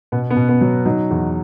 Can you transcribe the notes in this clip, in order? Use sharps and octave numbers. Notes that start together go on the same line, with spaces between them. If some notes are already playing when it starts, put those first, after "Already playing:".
B2 B3
B3
B2
B3
F#3
F#3 D#4
E2